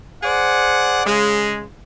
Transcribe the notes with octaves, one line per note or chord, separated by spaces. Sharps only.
G#4 C5 D5 F#5
C#3 G#3